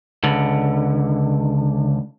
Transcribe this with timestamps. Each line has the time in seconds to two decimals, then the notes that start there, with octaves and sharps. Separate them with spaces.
0.23 C#2 D3